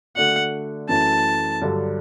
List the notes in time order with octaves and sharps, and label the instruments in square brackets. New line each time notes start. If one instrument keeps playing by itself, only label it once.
[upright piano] D3 A3 D4 F#4 [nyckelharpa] F#5
[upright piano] F#2 E3 A3 [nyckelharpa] A5
[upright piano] G2 D3 F#3